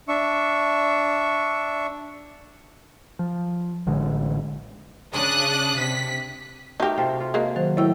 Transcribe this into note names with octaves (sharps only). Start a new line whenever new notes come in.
D4 E5 C#6
F3
A1 D3 G#3
C#3 D4 D#6 F#6
C3 B6
A3 D#4 F#4 G4 A#4
C3 F4 A4
F4
G#3 A#3 F#4
D#3 F#3 C5
A2 F#3 A#4 G5 E6